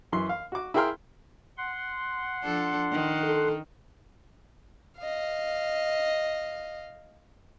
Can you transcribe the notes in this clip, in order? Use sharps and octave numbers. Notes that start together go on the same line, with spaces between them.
F#2 E3 C6
F5
F#4 D6
E4 G#4 A#4 G5 C6 F6
F#5 C6
F3 D4 A4
D#3
A4
D#5 F5